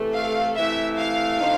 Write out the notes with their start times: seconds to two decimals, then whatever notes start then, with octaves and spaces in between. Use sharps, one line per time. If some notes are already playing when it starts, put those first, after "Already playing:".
Already playing: C3 E3 A3
0.14 F5
0.55 C3 E3 A3 E5
0.98 F5
1.40 D3 F3 A3 C4 D#4